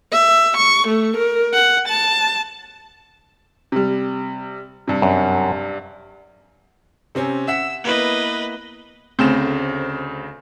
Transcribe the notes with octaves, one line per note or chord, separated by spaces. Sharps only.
E5
C#6
A3
A#4
F#5
A5
C3 G3
G2 C3
F#2
C3 C4 C#4
E5 F#5 E6 B6
A#3 B3 E4 B4 D#5
D2 C#3 A3 C4 C5 E7